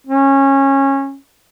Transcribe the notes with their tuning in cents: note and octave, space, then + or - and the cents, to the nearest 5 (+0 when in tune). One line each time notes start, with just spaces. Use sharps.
C#4 -20